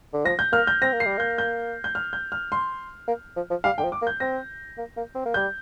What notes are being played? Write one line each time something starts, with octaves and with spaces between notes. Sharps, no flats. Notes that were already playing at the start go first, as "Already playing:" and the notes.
D3
F3 A#6
G6
A#3 F6
G6
C4 A#6
A#3
C7
G3
A#3 G6
G6
G6
F6
G6
F6
C6
A#3
F3
F3
G3 F5
D3 G5
F3
D6
A#3
G6
C4 A#6
A#3
A#3
C4
A#3
G3 G6